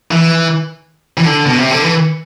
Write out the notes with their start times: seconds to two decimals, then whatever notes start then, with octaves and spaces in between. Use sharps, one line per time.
0.11 E3
1.17 E3
1.25 D3
1.46 B2
1.58 C3
1.71 D3
1.83 E3